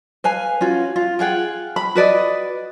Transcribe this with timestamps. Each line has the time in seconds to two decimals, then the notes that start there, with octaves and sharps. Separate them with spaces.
0.24 B4 F5 G#5
0.61 C#4 F4 F#4
0.96 F4
1.19 F4 G#4 F#5 G5
1.76 B5
1.95 F#4 B4 D5 D#5